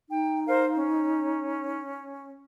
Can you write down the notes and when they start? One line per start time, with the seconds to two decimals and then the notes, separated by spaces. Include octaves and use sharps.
0.10 D#4 G5
0.47 A#4 C5 F5
0.75 C#4